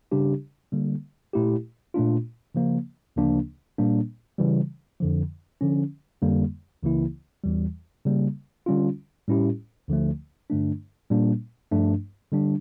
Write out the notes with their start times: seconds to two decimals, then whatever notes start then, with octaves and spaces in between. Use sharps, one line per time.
0.12 C#3 G3 D4 G4
0.72 D3 G3 A#3
1.33 A#2 A3 E4 G4
1.94 A#2 A3 D4 F4
2.55 C#3 F3 A#3
3.16 D2 C#3 F3 A#3 D4
3.78 A#2 G3 A#3 D4
4.38 C#3 E3 G3
5.00 F2 D3 F3
5.61 D3 F3 C#4
6.22 F2 D3 G3 A#3
6.83 C#2 C#3 E3 A#3 E4
7.44 E2 E3 G3
8.05 C#3 G3 A#3
8.66 D3 G3 C#4 F4
9.28 A2 G3 C#4 E4 G4
9.88 D2 D3 F3 A3
10.50 G2 D3 A3 D4
11.10 A#2 G3 A#3 D4
11.72 G2 F3 A3 D4
12.32 D3 G3 D4